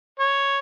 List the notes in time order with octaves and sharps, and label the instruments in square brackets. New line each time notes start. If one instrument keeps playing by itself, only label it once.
[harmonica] C#5